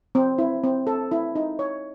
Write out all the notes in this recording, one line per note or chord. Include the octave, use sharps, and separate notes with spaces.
C4
E4
C4
A4
E4
D#4
C#5